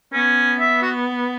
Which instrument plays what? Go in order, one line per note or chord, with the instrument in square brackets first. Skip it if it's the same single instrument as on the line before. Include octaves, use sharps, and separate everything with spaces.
[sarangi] B3 [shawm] C#4
[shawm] E5
F#4